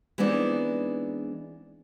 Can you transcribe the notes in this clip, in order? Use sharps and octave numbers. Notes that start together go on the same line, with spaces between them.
E3 G#3 B3 C4 D4 D#4